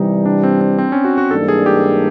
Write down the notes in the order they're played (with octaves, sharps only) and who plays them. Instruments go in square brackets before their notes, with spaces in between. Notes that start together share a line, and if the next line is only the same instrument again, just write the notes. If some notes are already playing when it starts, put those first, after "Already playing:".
Already playing: [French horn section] C3 E3 G3 [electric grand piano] D#4
[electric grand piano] D4
C4
C4
C4
C#4
F#4
F#4
[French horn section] G#2 E3 G3 A#3 D4 [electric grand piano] A4
[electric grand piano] G#4
G4